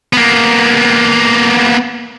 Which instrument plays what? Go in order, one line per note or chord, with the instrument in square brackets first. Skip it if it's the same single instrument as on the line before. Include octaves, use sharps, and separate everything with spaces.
[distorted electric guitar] A#3 B3